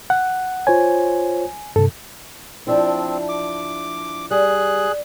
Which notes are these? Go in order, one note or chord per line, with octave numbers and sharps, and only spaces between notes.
F#5
F4 C5 C#5 G#5
G2 C3 A4
F3 C4 D4 E4
D6
G3 G#4 F#6